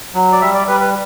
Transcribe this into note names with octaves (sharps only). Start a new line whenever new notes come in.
F#3
D5
G3 E5
D5
G3 B4
B4